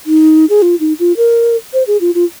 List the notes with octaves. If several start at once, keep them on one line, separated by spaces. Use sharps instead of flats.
D#4
G#4
F4
D#4
F4
A#4
C5
G#4
F4
F4